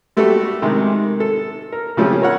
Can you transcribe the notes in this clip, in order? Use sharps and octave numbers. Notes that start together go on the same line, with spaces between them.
G3 A3 F#4 G4 A4
C3 D#3 G#3
A4
A#4
C#3 F3 A3 C#4 G4 G#4
A#4 C#5 F#5